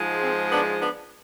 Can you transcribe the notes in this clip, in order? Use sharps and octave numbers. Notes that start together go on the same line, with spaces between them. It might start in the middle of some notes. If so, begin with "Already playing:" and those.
Already playing: G#2 F3 G#3
C4
B3 D4
B3 D4